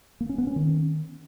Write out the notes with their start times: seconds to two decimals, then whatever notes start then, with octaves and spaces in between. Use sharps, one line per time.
0.21 A#3
0.29 C#4
0.38 B3
0.47 C#4
0.56 D#3